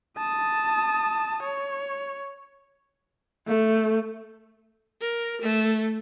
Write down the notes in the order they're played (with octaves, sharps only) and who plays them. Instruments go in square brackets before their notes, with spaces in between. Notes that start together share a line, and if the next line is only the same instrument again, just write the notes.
[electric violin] A5 D#6
C#5
[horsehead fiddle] A3
[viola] A#4
A3